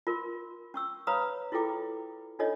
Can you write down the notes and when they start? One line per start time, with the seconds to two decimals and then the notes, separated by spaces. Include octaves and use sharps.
0.07 F4 A#4 C6
0.74 C#4 C#6 E6
1.07 B4 C#5 F5 A#5 B5 D#6
1.52 E4 F4 G#4 A4 G5 D6
2.39 D4 D#4 F4 A4 C#5 D#5